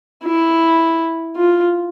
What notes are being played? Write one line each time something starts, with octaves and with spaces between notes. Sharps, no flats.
E4
F4